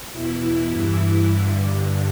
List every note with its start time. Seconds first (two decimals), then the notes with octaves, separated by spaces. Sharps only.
0.12 E2 B2 E4
0.70 G2 E3
1.29 G2 D3